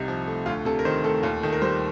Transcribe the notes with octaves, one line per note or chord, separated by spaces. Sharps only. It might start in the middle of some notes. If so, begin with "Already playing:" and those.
Already playing: C2 C3 D#4
F3
A3
D2 F4
C3 A4
A#4
D#3 C5
A3 A4
D#2 F4
D#3 A4
A#4
G3 C5